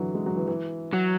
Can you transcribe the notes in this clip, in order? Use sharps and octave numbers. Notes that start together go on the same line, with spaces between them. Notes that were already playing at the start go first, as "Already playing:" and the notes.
Already playing: D3 E3 F#3
G#3
F#3
E3
E3
F#3